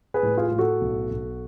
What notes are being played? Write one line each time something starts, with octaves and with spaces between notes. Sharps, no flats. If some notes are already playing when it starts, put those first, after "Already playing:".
G#4 B4
A2
F4 G#4
A2 G#4
F#4 A4
B1
B1